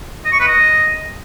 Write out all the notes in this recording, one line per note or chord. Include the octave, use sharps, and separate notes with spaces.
D#5
C#6
B4
D#5